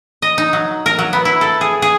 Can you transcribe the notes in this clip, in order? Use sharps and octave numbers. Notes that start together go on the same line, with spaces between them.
D#5
D#4
F#3
A#4
F#3
B3
E4
A4
G#4
G#4